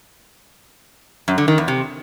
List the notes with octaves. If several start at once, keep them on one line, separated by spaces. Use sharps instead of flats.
F#2
D3
D#3
E2
C3